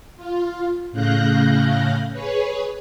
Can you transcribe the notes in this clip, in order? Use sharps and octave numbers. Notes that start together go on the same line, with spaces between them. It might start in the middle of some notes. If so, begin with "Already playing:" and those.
F4
A2 C#3 F5 F#6 G6 A#6
G#4 B4 C#5